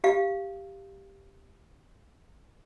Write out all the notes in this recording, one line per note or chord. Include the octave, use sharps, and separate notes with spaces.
G4 F5